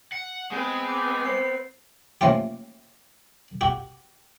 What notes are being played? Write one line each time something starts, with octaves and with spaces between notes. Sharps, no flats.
F#5
G#3 B3 C4
D6
C5 C7
F3 A3 A#3 C#4 F4 G4
F#4 G4